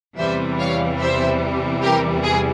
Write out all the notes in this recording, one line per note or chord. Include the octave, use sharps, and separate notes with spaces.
E2 C3 E3 G3 C5 E5
C#5 F5
C5 E5
G4 A#4
G#4